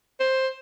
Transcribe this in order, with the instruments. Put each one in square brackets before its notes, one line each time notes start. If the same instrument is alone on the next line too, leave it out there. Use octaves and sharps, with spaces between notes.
[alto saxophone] C5